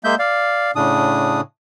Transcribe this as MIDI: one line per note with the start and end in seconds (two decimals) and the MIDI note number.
0.04 0.15 56
0.04 0.15 58
0.04 0.15 76
0.04 0.15 91
0.19 0.71 74
0.19 0.71 77
0.76 1.41 45
0.76 1.41 49
0.76 1.41 62
0.76 1.41 87